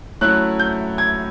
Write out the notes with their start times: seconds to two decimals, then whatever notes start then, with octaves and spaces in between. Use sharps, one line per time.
0.21 F#3 A3 C#4 E4 F#6
0.59 G6
0.98 G#6